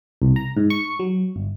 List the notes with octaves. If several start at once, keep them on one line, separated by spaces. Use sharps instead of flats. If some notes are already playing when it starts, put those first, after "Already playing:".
C2
A#5
G#2
C#6
F#3
G1